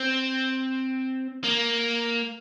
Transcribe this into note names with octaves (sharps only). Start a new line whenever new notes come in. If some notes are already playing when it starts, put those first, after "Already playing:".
Already playing: C4
A#3